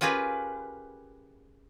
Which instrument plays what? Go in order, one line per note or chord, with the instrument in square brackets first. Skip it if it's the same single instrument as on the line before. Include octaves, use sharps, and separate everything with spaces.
[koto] C#4 F4 G4 G#4 A#4 B4